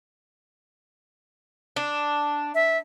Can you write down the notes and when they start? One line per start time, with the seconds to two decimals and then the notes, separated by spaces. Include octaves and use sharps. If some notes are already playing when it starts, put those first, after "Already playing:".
1.76 D4
2.55 E5